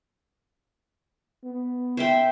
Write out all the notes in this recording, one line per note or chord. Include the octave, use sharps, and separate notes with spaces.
B3
C5 E5 G5